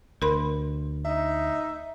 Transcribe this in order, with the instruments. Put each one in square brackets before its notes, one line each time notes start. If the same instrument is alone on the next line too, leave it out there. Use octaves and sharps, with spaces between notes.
[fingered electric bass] D2 [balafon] A#4 B5 C6
[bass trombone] D#4 [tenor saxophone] E5